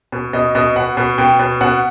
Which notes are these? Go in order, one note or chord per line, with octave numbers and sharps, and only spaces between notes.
B2
B2 D#5
B2 D#5
B2 F#5
B2
B2 G5
B2
B2 F#5